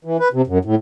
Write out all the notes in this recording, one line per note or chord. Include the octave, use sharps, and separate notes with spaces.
E3
B4
C3
F#2
A2